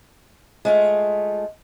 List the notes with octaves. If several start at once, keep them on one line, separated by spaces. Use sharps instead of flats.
G#3 A3 F4